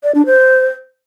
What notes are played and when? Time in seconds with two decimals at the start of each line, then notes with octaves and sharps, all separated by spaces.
0.03 D5
0.15 D4
0.26 C5